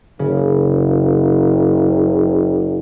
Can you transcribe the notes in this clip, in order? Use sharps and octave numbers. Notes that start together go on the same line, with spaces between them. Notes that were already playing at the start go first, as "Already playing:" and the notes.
F#1 C#3